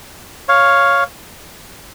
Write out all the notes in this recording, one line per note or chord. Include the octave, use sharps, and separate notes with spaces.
C#5 F5